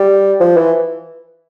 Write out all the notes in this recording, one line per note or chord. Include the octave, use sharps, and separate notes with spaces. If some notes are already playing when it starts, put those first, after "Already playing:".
Already playing: G3
F3
E3